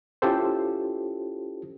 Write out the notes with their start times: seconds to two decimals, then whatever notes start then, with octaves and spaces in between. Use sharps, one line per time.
0.22 C#4 E4 F4 G4 A4 C5